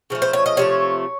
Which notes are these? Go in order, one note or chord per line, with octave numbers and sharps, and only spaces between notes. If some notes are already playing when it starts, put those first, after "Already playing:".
C#3 F3 A3
C5
C#5
D#5
C3 F3 A3 C#5